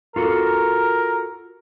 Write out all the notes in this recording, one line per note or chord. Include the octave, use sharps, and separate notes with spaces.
F4 F#4 A4 A#4